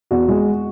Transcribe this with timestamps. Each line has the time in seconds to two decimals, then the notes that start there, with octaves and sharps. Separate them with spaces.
0.11 E2 F#4
0.28 G#3